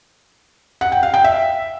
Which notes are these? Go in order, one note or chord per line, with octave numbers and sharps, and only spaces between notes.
F#5
G5
F5
G5
E5